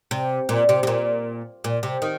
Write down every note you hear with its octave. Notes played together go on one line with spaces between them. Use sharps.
C3
A#2
C3
C3
A#2
A#2
C3
D#3